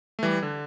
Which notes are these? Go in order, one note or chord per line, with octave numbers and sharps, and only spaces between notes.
A3
E3 G3
D3